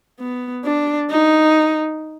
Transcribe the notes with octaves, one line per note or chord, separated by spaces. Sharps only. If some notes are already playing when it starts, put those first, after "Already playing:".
B3
D4
D#4